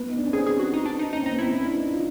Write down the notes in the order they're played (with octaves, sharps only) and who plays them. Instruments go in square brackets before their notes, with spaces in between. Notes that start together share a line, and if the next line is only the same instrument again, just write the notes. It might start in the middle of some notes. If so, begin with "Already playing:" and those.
Already playing: [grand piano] B3
D#4
D4
C#4
[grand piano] C4 [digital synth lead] G#4
[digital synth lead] G#4
F#4
D#4
D4
D#4
[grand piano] C#4 [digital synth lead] D#4
[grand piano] C4
[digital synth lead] D#4
[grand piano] B3
[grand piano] C4 [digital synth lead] E4
[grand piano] C#4
D4
D#4
F4